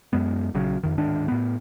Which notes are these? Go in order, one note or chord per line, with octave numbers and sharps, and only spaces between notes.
F#2 G#3 B3
A#1 C#3 F#3
F2 D#3
D1 G#2 D#3 D4
A2 B3